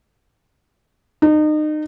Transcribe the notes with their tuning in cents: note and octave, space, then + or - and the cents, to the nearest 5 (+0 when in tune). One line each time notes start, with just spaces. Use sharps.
D#4 -30